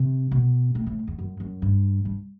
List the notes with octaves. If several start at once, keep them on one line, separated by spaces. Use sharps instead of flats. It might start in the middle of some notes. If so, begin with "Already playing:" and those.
Already playing: C3
B2
A2
A2
E2
F#2
F#2
G2
G2